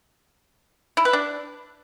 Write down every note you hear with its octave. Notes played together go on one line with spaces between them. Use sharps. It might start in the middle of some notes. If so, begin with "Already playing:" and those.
E4
B4
D4